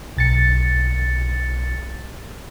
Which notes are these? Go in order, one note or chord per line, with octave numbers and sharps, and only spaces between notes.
B1 A6 C#7